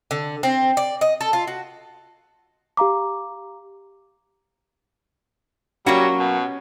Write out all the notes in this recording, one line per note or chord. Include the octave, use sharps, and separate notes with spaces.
D3
C4
D5
D#5
A4
F4
F#4
G4 F5 A#5 D6
F#3 G3 A#3 C#4 F#4 C#7
B2